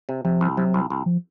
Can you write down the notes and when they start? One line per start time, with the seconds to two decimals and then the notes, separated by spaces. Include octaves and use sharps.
0.09 C3
0.25 C3 F3
0.41 C2
0.57 C3 F#3
0.74 C2
0.90 C2
1.06 F3